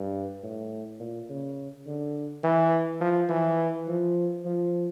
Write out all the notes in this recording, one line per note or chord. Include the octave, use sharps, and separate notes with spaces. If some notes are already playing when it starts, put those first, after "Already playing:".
Already playing: G2
A2
A#2
C#3
D3
E3
F3
E3
F3
F3